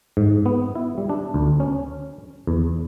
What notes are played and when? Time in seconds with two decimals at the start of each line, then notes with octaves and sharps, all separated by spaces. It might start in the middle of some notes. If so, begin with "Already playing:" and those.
0.17 G#2
0.46 B3
0.75 E4
0.98 G3
1.09 D4
1.34 D2
1.60 C#4
2.47 E2